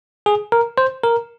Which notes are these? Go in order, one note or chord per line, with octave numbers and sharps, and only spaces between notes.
G#4
A#4
C5
A#4